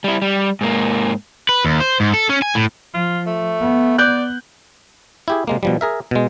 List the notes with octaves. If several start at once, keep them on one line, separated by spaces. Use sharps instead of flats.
G3 E4
G3
G#2 A#3
B4
D#2
C5
G#2
A4
C#4
G#5
A2
F3 F4
A3
B3
D5 F#6 G6
E4 G4 G#4
C3 G#3 A#3
B2 F3 G3
G#4 A#4 E5
B2 G#3